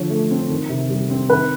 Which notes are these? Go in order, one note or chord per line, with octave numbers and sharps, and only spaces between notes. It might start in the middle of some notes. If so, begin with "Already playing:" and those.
Already playing: D3 F3 C#5
A3
C4
D#3
C3
G3
C4
D#3 B4